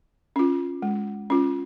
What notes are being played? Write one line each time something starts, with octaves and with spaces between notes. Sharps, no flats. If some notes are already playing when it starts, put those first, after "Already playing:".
C#4 F4
G#3
C#4 F4